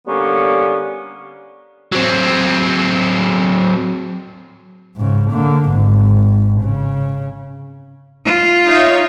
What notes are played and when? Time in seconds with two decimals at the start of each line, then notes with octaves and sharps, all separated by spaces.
0.07 D3 G3 A#3 B3 C#4
1.92 F#3 C4
4.96 G#2 C#3
5.30 D3 A#3
5.70 G#1 G#2
6.60 C#3
8.26 F4
8.67 D#4 C#5 E5